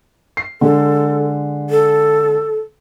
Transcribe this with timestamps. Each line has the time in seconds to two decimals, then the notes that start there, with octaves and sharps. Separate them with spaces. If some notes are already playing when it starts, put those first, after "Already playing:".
0.37 C7
0.61 D3 G#3 A4
1.70 A4